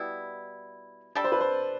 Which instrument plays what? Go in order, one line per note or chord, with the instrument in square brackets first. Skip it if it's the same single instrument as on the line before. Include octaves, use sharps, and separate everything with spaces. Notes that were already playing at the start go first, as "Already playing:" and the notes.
Already playing: [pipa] B2 G3 B3 E4
[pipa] G3 D4 A4 [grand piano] D5
[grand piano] C5
B4
C5